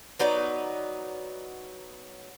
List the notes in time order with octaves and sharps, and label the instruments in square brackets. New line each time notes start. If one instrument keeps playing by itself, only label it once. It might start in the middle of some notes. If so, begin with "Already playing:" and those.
[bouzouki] F#3 B3 D#4 D5